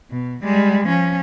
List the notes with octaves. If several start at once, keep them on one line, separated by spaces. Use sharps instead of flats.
B2
G3 G#3
F3 C#4